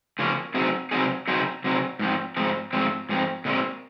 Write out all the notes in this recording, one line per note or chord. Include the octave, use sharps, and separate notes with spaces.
C#3 F3 A#3 C#4
C3 F#3 C4 D#4 G#4
C3 F#3 C4 D#4 G#4
C3 F#3 C4 D#4 G#4
C3 F#3 C4 D#4 G#4
G#2 F3 C4
G#2 F3 C4
G#2 F3 C4
G#2 F3 C4
A#2 G#3 C4